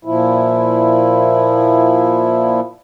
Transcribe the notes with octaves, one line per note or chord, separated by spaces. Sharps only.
A#2 F3 E4